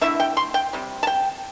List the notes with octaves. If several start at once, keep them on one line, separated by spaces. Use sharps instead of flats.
D3 A3 E4 E5
G5
C6
G5
C3 G3
A5
G5